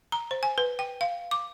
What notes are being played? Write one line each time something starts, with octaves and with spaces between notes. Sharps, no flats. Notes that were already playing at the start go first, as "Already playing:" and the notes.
A#5
C5
G#5
B4
G5
F5
D6